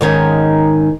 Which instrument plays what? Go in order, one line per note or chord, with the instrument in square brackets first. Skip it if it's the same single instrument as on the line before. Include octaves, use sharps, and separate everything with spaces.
[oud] G#2 D#3 C#4